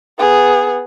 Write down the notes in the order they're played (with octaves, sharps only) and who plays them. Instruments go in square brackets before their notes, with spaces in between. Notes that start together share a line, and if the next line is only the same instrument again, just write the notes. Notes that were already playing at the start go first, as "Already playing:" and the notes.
[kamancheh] B3 G#4